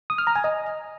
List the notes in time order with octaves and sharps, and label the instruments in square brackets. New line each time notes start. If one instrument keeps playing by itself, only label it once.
[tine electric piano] D#6
F6
A#5
G#5
D#5